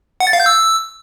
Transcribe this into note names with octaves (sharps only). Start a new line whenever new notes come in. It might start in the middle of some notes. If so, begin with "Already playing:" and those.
F#5
A6
F5
G6
E6